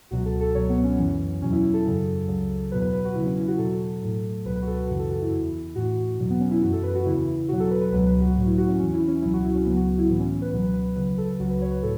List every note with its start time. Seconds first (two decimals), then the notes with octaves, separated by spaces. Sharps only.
0.11 C#2 B2 F#3 F#4
0.25 A4
0.41 A4
0.55 C#2 B2 F#3 C#5
0.69 B3
0.84 C#4
0.98 F#2 E3 C#4
1.42 E2 B2 F#3 C#4
1.52 E4
1.63 E4
1.74 A4
1.84 F#2 C#3 F#3
2.28 C#2 C#3 F#3
2.71 E2 B2 F#3 B4
2.82 B4
2.93 B4
3.05 F#4
3.15 E2 C#3 F#3 E4
3.26 C#4
3.36 E4
3.48 F#4
3.58 E2 B2 F#3 A4
4.02 A2 F#3
4.45 C#2 B2 F#3 B4
4.56 B4
4.62 F#4
4.67 A4
4.78 F#4
4.88 F#2 C#3 E3 F#4
4.99 A4
5.10 F#4
5.21 E4
5.32 E2 E3
5.75 A2 E3 F#4
6.19 E2 B2 F#3
6.30 B3
6.40 C#4
6.51 E4
6.62 F#2 E3 F#4
6.73 A4
6.83 B4
6.95 F#4
7.06 E2 C#3 E3 E4
7.48 E2 B2 F#3 F#4
7.60 A4
7.71 B4
7.82 B4
7.92 C#2 B2 F#3 B4
8.07 B4
8.21 F#4
8.36 A2 F#3
8.46 E4
8.58 F#4
8.68 C#4
8.79 E2 E3 C#4
8.93 E4
9.08 C#4
9.22 C#2 B2 F#3 E4
9.33 F#4
9.45 E4
9.55 C#4
9.66 C#2 C#3 F#3 B3
9.76 F#4
9.98 E4
10.09 A2 E3 B3
10.19 C#4
10.42 B4
10.52 C#2 B2 F#3 B4
10.74 B4
10.96 E2 C#3 F#3 B4
11.18 A4
11.39 C#2 C#3 F#3 F#4
11.50 B4
11.61 C#5
11.71 B4
11.83 A2 A4